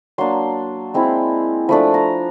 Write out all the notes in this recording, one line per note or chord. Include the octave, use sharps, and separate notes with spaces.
F#3 A#3 D4 C6
G#3 C4 E4
F3 A3 D4 B5
A#5